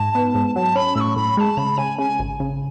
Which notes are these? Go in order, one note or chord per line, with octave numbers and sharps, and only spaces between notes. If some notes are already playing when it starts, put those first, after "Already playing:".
Already playing: G#2 D#4 A5
B3
G#2
F#3 A5
C#4 B5
A2 C#6 E6
A2 B5
G#3 A5 B5
C#3 B5
C#3 G#5
C#3 G#5
G#1
C#3